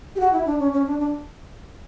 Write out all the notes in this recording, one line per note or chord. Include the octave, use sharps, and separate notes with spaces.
G4
F#4
E4
D4
C#4
C#4
D4
D4